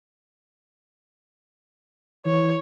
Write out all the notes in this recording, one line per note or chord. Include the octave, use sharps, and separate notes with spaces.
E3 C#5